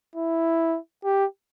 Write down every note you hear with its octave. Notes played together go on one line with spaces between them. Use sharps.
E4
G4